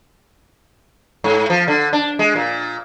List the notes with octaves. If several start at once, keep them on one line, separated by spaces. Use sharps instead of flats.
G#2
F3
D3
D4
G#3
A#2